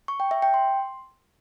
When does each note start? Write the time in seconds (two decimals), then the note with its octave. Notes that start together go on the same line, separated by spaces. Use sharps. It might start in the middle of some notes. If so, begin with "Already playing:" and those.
0.08 C#6
0.20 G5
0.31 E5
0.42 G5
0.54 C6